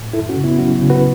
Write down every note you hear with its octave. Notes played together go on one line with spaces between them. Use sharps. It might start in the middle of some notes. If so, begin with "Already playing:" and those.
Already playing: A2
F#2 E4 A4
C#4 F#4
C#3
B3 E4
F#3 C#4 F#4
C#3
F#4 B4